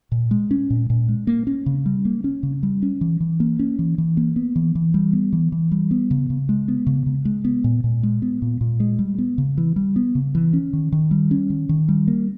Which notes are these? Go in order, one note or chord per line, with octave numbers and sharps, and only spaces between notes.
A#2
G#3
C#4
A#2
A#2
G#3
A#3
C#4
C#3
G3
A#3
C#4
C#3
G3
C#4
E3
E3
A#3
C#4
E3
E3
A#3
B3
E3
E3
G3
B3
E3
E3
G3
B3
C#3
C#3
G#3
B3
C#3
C#3
G#3
B3
A#2
A#2
G#3
B3
A#2
A#2
G#3
G3
B3
C#3
E3
G3
B3
C#3
E3
C#4
D#3
D#3
G3
C#4
D#3
D#3
G3
A#3